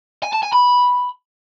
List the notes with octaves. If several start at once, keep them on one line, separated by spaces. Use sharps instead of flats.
G#5
A5
G#5
B5